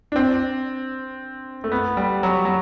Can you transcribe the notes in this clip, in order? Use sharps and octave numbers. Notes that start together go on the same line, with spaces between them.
D4
C4
A3
B3
G3
F#3
F#3